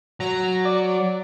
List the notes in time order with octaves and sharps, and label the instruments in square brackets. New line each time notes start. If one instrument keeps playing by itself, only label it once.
[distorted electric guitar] F#3 [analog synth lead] A#5
[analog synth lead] D5